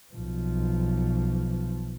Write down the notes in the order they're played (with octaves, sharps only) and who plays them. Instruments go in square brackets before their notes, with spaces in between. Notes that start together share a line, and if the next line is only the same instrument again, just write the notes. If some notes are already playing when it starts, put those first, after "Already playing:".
[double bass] B1 F3